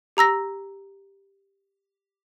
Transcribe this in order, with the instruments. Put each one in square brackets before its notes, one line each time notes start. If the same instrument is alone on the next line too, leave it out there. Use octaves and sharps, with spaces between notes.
[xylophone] G4 A#5 E6 A#6